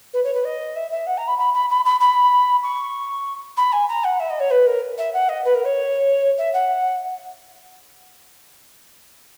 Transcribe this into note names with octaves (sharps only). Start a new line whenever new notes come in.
B4
C#5
B4
D#5
E5
E5
F#5
A#5
B5
B5
B5
B5
B5
B5
C#6
B5
G#5
A#5
F#5
E5
D#5
C#5
B4
A#4
E5
F#5
D#5
B4
A#4
C#5
E5
F#5